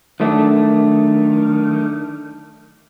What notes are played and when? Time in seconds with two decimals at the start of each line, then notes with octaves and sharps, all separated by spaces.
0.20 D#3 F#3 A3 D4